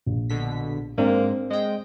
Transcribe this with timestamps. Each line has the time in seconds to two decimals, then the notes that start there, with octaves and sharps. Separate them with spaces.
0.06 A#1
0.30 B2 D3 B6
0.98 G#2 A#3 C4 D4 D5
1.50 G#3 D#5 G5